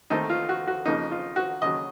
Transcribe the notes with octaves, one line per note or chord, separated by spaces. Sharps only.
D#2 D#3 A3 C4 D#4
F4
F#4
F#4
F2 C#3 F3 A#3 D#4
F4
F#4
D#2 C#3 F#3 D#5